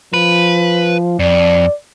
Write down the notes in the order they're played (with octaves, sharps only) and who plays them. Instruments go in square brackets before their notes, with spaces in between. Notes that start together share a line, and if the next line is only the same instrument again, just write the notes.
[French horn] F3 [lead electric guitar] B4
[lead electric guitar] F2 [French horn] D5